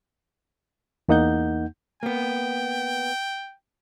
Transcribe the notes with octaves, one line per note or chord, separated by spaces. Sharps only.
E2 A#3 D#4 F#5 G6
A#3 B3 G5